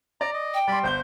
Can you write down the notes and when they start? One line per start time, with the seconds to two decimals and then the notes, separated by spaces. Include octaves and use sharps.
0.21 D5 A#5 D6
0.34 D#5
0.54 G5
0.68 G3 D5 B5 C6
0.84 G1 C5 G6 G7